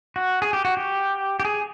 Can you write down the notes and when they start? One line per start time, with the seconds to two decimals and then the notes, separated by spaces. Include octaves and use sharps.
0.16 F#4
0.42 G#4
0.53 G4
0.65 F#4
0.77 G4
1.40 G4
1.45 G#4